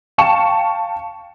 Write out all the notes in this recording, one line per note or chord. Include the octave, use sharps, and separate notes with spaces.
F5 G5 A5 C#6 C#7 E7